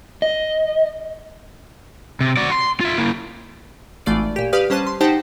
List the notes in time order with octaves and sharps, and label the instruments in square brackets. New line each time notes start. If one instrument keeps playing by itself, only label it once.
[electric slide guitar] D#5
[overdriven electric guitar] C3
F#4 D5
C6
F4 E5
A#3 E4
[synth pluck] G#1 E3 A3 F4 D5 D7
A#2 G4
G4 B4 D5 F5 D#6 F6
G3 C#4 C5 A5 F#6 D#7
C6
D#4 G4 C5 F#5 G5 A5